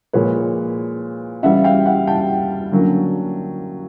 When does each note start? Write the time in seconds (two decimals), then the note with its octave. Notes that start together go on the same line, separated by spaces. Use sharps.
0.13 A#2 F3 G#3 B4 C#5
1.43 C#3 E3 G3 E5 F#5
1.64 F5 G5
1.86 E5 F#5
2.07 G5 A5
2.72 D3 F#3 A#3 C#4